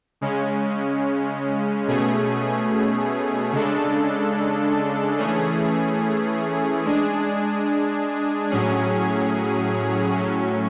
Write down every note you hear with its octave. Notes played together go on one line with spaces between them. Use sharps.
C#3 G#3 C#4
B2 A3 C#4 G#4
C#3 G#3 D4 A4
E3 A3 C#4 G#4
G#3 D4 G#4
A2 F#3 C#4 G#4
A2 F#3 C#4